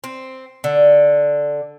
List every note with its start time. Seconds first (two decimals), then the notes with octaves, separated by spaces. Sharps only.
0.04 C4
0.64 D3